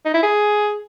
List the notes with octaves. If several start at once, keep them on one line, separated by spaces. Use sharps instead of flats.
D#4
E4
G#4